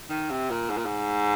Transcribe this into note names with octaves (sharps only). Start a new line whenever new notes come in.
D#3
C3
A#2
G#2
A#2
G#2